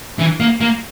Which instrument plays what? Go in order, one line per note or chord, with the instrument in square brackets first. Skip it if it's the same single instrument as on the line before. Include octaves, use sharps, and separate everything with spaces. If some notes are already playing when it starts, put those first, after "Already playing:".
[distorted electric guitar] E3
A#3
A#3